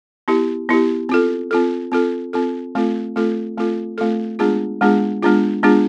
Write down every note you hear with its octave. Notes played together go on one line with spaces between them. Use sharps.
B3 E4 G4
B3 E4 G4
C4 F4 A4
C4 F4 A4
C4 F4 A4
C4 F4 A4
A3 C4 F4 A4
A3 C4 F4 A4
A3 C4 F4 A4
A3 C4 F4 A4
G#3 B3 D4 F4 G#4
G#3 B3 D4 F4 G#4
G#3 B3 D4 F4 G#4
G#3 B3 D4 F4 G#4